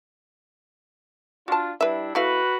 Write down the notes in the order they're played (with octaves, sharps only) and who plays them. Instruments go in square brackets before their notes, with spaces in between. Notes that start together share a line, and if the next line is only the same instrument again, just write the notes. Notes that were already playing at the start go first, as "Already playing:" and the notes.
[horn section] D4 F4 [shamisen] F#4 A5
[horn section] G3 D4 E4 [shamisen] B4 E5
[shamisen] A3 E4 F5 [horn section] F#4 B4